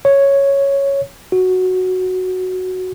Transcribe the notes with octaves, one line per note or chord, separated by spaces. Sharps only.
C#5
F#4